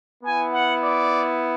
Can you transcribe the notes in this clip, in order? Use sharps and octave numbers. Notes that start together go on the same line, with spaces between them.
B3 E4 G#5
F#5
D5